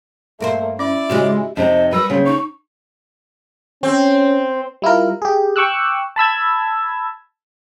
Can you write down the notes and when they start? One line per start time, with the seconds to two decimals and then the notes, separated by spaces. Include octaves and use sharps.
0.40 G2 A3 A#3 A#4 C5
0.79 C#4 E4 D5 D6
1.10 G#2 C#3 G#3 F#4 G4 D#5
1.57 F2 C3 D#4 C5 D#5
1.93 G3 A#4 B4 E6
2.10 C#3 A#3 C4 C5
2.25 D#4 C#6
3.83 C4 C#4
4.82 G3 E4 F4 A#4
5.22 G4 G#4
5.56 G5 C#6 D6 E6 F#6
6.16 A5 B5 E6 G#6